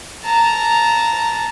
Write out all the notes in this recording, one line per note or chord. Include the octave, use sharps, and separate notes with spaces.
A5 A#5